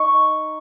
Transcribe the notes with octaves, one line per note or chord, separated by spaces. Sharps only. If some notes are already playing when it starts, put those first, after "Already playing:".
Already playing: D#4 C#6